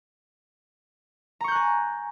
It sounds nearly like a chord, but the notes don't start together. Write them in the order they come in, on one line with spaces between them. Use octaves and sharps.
A#5 C#6 G6 F#6 G#5